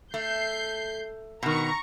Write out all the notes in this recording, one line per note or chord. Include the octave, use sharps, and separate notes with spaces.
A3 G6 C7
B2 D#3 A#5 C#6